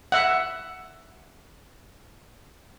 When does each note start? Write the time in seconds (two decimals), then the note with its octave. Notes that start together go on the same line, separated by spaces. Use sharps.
0.12 E5 F#5